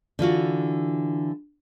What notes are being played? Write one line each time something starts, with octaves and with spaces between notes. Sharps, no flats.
D3 E3 F4 F#4